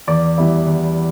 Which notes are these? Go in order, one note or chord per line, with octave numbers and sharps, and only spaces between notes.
E2 D5
E3 G3 B3 E4
E2